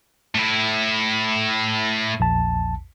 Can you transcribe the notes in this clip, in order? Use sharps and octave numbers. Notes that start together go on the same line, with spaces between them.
A2 E4
A#1 E2 A5